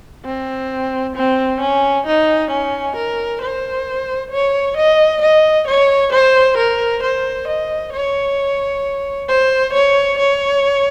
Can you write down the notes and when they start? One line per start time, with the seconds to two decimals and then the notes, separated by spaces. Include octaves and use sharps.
0.25 C4
1.16 C4
1.61 C#4
2.07 D#4
2.51 C#4
2.96 A#4
3.41 C5
4.31 C#5
4.77 D#5
5.22 D#5
5.68 C#5
6.12 C5
6.57 A#4
7.03 C5
7.47 D#5
7.93 C#5
9.29 C5
9.73 C#5
10.19 C#5